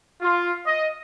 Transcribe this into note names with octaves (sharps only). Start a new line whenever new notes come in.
F4
D#5